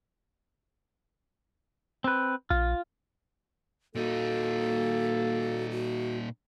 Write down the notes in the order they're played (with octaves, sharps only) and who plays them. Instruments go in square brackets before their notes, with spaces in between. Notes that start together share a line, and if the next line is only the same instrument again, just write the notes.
[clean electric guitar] C4 B4
[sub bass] A#1 [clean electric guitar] F4
[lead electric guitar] A#2 D#4 [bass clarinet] A#3 [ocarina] F#4 [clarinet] A4
[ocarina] F#4